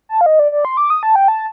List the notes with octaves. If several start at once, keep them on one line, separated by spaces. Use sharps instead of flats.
A5
F5
D#5
D5
D5
C6
D6
D#6
A5
G5
A5